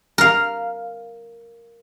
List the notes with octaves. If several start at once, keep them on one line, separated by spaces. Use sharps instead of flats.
A#4 F5